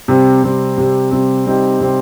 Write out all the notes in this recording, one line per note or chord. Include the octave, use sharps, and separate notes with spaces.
C3 G3 C4
C3 G3 C4
C3 G3 C4
C3 G3 C4
C3 G3 C4 D#4 G4
C3 G3 C4 D#4 G4